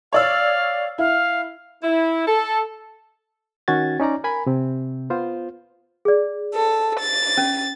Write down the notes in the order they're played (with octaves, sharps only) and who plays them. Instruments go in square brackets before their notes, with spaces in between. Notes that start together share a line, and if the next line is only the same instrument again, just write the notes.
[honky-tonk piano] C#5 D5 E6 [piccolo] F5
[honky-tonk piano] E4 [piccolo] F5
[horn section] E4
A4
[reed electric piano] D#3 C#4 F#4 G#6 A6
C#4 D#4 D5 A#5
A#4 G#5 B5
C3 C4
B3 F4 C5
[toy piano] G#4 D5
[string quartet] A4
A6
[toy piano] C#4